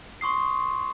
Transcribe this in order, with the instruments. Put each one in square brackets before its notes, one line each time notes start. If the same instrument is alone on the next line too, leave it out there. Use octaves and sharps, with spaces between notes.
[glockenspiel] C6 C#6 D#6 C7